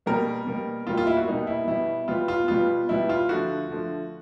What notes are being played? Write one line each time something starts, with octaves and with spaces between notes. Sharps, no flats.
B2 G3 A#3 A#4
B2 G3 A#3
B2 G3 A#3 F4
F4
E4
F#4
B2 G3 A#3 D#4
E4
B2 G3 B3 E4
B2 G3 B3 F4
F4
B2 G3 B3 F4
B2 G3 B3 E4
F4
D3 F3 A3 F#4
D3 F3 A3